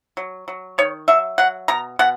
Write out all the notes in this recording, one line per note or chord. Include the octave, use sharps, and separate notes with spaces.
F#3
F#3
D#3 C#5
F#3 E5
F#3 F#5
B2 A#5
B2 F#5